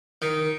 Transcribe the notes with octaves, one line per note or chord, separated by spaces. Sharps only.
D#3